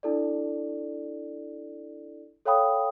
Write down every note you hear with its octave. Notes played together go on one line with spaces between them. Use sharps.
D4 E4 A4 D5
A4 C#5 F5 G5 B5 D#6